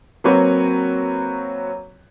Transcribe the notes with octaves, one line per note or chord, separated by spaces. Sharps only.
F#3 A#3 C4 F#4 B4 C#5